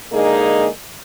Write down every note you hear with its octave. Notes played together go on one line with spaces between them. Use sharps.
D3 G#3 A#3 D#4 G#4